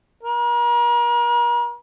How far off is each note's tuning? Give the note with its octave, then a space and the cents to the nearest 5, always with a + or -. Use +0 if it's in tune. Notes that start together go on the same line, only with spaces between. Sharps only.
A#4 +40